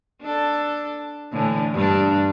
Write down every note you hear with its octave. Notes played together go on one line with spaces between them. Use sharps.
D4 A4
A2 D3 E3
G2 D4